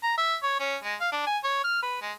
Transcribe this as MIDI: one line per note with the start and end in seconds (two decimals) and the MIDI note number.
0.03 0.17 82
0.18 0.36 76
0.43 0.58 73
0.60 0.76 61
0.84 0.95 56
1.00 1.08 77
1.12 1.23 62
1.26 1.38 80
1.44 1.62 73
1.64 1.80 89
1.83 1.99 71
2.02 2.12 56